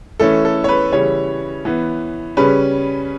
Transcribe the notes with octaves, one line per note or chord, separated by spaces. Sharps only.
E3 A3 C#4 A4
A4
C#5
B4
C#3 E3 G3 C#4 C#5
E3 B3
C#3 G3 C#4 B4